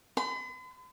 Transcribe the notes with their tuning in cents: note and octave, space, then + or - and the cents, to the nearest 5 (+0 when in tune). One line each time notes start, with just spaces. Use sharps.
B5 +45